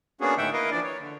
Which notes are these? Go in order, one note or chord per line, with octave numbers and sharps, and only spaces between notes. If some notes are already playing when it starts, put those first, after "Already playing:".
A#3 B3 C#4 D4 F#4 G#4
A2 D3 D#3 E5 F#5 G5
A#3 E4 A#4 B4 D#5 F5
E3 F3 D4 D5
C#5
D3